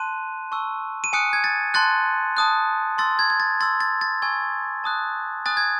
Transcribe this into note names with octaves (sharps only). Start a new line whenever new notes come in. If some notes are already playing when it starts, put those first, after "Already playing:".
Already playing: A5 C6 F#6 D#7
A5 C#6 E6
D#7
G#5 D#6 F#6 C#7
G#6
A6
A5 C6 F#6 A6
A5 D#6 F#6
C6 E6 A6
G#6
G#6
A6
C6 E6 A6
A6
A6
G#5 C#6 E6 G#6
A5 D#6 F#6
G#5 D#6 F#6 A6
G#6